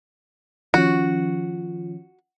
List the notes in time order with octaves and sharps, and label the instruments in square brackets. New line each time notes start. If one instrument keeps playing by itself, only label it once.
[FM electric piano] D#3 F3 C#4 [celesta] F4 [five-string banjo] F#4